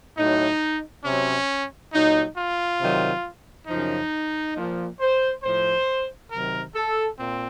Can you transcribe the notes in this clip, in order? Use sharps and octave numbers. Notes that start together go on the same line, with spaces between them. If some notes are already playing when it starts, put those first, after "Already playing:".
A2 F#3 D#4
C3 F#3 C#4
A#2 F#3 D#4
F4
C3 D#3 F#3
F#2 C#3 F3 D#4
A#2 F3
C5
A2 F3 C5
C3 D#3 F#3 A#4
A4
A#2 C4